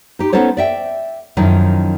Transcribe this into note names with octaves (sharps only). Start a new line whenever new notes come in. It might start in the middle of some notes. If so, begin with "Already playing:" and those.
D#4 G4
B3 C#4 D#4 A4 C5 C#5
D5 E5 G5
F#2 D#3 F3 D#4 E4